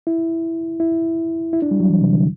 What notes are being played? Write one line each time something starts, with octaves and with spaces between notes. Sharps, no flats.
E4
E4
E4
D4
G3
F#3
E3
C3
D3